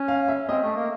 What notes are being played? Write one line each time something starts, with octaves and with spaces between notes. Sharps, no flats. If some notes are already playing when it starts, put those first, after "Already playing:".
Already playing: C#4
F5
E5
C4 D#5
A3
A#3